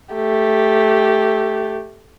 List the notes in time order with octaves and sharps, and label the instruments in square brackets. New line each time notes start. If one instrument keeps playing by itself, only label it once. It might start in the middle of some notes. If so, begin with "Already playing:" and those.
[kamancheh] A3 G4